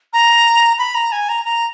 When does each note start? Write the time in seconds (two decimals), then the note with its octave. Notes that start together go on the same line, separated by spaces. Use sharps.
0.13 A#5
0.79 B5
0.95 A#5
1.12 G#5
1.29 A#5
1.45 A#5